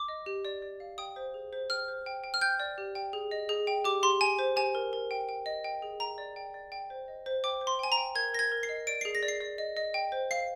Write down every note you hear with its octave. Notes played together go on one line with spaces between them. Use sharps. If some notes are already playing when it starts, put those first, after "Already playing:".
Already playing: D6
D#5
G4
D5
D5
F5
G5 D#6
C5
G#4
C5
G5 F6
C5
G5
G5
F6
G5 G6
D5
G4
G5
G#4
D#5
G#4
G5
G4 D6
G4 C6
G4 G#5
C5
G4 G#5
A#4
A#4
G5
G5
D#5
G5
G#4
G5 A#5
D5
G5
D5
G5
C5
D#5
C5
G5 D6
C5
C6
G5 G#5
A#5
G5
A#4 G#6
A#4 A#6
G#6
A#4
C7
D#5
D5 D7
G#4 C7
A#6
D5
C7
D5
D#5
D#5
G5
C5
F5 C7